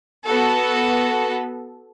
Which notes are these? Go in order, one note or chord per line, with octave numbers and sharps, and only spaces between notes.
B3 F#4 A4